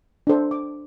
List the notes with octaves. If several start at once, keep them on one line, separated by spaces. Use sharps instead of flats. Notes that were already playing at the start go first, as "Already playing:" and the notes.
D4 A4 C5
D6